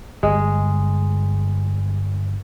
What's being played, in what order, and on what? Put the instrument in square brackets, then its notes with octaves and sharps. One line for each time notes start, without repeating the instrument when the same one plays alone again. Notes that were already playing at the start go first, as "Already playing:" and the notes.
[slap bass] G1 [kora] G#3